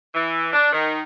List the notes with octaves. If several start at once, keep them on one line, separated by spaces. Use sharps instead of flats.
E3
D4
D#3